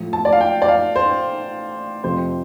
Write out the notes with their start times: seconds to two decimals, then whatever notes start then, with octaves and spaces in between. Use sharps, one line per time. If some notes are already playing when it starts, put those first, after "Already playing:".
Already playing: A2 F3
0.13 A5
0.25 D5
0.33 F5
0.41 G5
0.62 D5
0.68 F5
0.96 C5
2.04 F2 C3 F3 C5